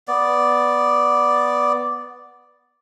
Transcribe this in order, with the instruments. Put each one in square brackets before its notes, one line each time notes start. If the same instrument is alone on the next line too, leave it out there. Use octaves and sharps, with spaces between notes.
[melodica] B3 D5